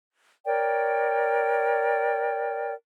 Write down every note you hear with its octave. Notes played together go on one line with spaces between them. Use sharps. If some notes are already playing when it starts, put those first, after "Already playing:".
A#4 C#5 D5 G5